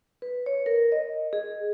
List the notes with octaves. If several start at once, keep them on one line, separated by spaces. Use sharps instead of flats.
B4
C#5
A#4
D#5
G#4